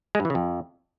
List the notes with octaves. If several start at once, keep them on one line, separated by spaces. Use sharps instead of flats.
G#3
G2
E3
C#3
F2